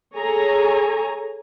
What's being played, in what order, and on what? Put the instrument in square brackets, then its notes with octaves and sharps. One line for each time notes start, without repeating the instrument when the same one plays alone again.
[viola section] G#4 A4 C#5 G#5 A#5